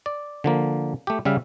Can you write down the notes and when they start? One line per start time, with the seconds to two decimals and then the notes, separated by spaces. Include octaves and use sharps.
0.06 D5
0.44 D3 F3 A#3
1.07 A3 G4
1.25 C#3 G3 E5 F5